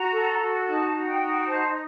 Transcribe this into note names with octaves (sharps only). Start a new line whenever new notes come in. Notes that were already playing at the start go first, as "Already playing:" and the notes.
Already playing: F#4 A#5
A4
F#4
D#4 A5
F#4
G5
D#4
G5
C5 A5